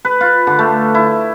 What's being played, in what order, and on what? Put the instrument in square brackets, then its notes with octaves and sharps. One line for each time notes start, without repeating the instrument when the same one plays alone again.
[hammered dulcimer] B4
F4
D3
A3
E4